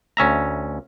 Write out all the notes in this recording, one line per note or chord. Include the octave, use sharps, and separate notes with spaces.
D2 C#4 E5 A#5